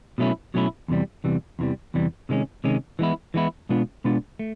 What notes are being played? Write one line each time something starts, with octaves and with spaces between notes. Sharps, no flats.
B2 F#3 A3 C#4 E4
B2 F#3 A3 C#4 E4
E2 C3 E3 G3
E2 C3 E3 G3
E2 C3 E3 G3
E2 C3 E3 G3
C3 D#3 G#3 C#4
C3 D#3 G#3 C#4
E3 G#3 B3 E4
E3 G#3 B3 E4
B2 G#3 B3 D4 F4
B2 G#3 B3 D4 F4
A3